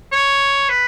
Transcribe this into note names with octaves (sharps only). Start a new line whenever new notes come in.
C#5
B4